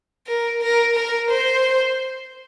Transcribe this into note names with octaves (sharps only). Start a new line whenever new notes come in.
A#4
A#4
A#4
C5